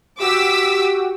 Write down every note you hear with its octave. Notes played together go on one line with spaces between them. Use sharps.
F#4 G4 D6 E6 B6